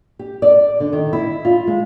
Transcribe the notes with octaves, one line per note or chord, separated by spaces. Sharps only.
G4
D5
D3
D#3
E4
F4
G#3